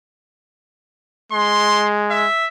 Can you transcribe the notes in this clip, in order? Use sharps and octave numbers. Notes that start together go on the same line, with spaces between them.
G#3 C6
E5